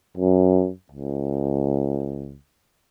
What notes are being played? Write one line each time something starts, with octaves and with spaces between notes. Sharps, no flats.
F#2
C#2